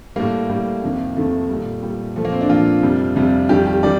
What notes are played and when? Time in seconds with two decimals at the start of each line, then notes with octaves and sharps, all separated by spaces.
0.16 A2 G3 A#3
0.49 A2 G3
0.83 F2 C3 D#3
1.16 F2 C3 D#3 A3
1.49 A#2 G3
1.83 A#2 G3
2.16 A#2 F3 A3
2.25 A#3
2.32 C4
2.41 D4
2.49 A#2 F3 F4
2.83 F2 C3 G3
3.16 F2 C3 G3
3.49 F2 D#3 G3 G4
3.66 G4
3.83 D#3 G3 D5